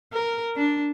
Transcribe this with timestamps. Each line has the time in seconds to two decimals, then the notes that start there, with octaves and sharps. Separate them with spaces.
0.13 A#4
0.56 D4